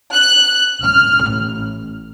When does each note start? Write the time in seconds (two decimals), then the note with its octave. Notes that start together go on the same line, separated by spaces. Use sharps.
0.13 F#6
0.84 F6
1.30 A1